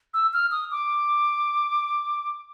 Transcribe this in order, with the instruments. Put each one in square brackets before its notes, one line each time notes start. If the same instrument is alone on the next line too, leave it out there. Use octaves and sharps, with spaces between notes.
[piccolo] E6
F6
D#6
D6